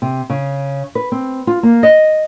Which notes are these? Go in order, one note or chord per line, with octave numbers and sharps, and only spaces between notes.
C3
C#3
B4
C4
F4
A#3
D#5